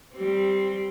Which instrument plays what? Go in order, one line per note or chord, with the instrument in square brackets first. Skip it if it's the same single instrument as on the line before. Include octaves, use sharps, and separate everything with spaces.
[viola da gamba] G3 C4